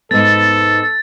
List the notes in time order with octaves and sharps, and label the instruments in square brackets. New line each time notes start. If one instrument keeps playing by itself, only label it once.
[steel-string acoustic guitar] G#2 B3 [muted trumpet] A4 [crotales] A6